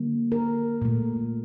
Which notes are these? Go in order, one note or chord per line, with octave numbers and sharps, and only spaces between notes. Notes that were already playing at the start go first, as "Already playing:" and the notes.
Already playing: D3 G3 A#3
A#4
A#2 A3